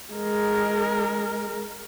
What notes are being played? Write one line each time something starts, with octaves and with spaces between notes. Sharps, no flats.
G#3 A#4